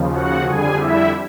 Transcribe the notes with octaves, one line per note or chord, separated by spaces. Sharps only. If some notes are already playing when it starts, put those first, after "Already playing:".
Already playing: D#2 C#3 F3
F#4 F#5
F2 D3 G3 G#4 G#5
E4 E5